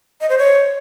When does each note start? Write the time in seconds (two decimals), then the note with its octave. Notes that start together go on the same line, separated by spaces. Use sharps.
0.21 D#5
0.29 C5
0.38 C#5